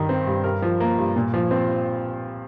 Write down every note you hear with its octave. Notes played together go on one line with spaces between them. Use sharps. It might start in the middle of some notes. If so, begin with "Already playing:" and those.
Already playing: G2 D#3
C4
G2
G2 A#4
F3
A#3
G2
A#2
F3
C4